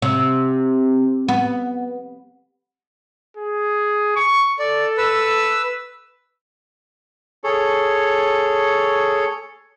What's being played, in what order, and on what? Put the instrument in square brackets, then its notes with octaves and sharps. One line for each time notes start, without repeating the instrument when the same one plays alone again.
[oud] C3
B3
[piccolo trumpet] G#4
C#6
[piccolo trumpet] A4 [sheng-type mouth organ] D5
[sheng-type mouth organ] B4 E6
[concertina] G#4 A4 C#5